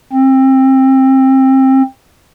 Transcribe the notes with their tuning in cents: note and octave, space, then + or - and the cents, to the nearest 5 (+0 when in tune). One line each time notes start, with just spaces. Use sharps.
C4 +25